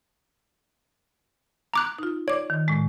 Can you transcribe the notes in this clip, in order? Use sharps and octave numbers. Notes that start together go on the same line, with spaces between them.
A#5 D6 F#6
D#4 F4
C#5 D5 D6
D#3
A2 G#3